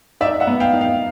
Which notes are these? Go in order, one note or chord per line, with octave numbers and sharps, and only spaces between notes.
D#4 D5 E5
E5 F#5
B3
F5 G5
D#4
F5 G5